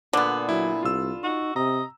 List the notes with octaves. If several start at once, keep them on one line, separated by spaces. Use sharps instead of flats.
A#2 D3 B3
F#3 E4
C2 F4 E6
D#4 F#4
C3 D#5 A#5